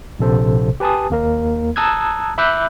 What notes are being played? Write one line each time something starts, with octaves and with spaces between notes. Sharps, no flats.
A#1 C3 A4 C5
G4 B4 G#5 A5 D#6
D#2 A#3 A#4
A5 A#5 D#6 E6 F#6 G#6
E5 B5 D6 E6 F#6 G6